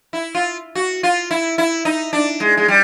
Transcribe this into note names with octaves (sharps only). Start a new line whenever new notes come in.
E4
F4
F#4
F4
E4
E4
D#4
D4
G#3
G#3
G3